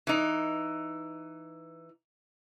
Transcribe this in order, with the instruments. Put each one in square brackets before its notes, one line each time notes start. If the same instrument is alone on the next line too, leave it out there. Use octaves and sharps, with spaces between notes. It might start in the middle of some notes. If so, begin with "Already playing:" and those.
[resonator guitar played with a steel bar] E3 D#4